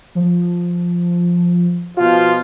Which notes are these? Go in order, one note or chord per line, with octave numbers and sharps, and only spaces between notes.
F3
B2 F3 F4